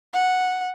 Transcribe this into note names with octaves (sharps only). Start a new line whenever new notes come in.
F#5